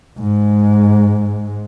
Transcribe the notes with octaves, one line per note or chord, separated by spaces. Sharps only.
G#2 G#3